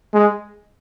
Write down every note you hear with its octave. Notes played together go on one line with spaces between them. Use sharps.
G#3